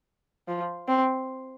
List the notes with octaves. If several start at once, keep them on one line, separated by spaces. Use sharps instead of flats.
F3
C4